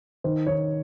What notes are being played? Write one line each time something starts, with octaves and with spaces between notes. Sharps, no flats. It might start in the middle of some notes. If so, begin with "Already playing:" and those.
D#3 C5
D#3 C#5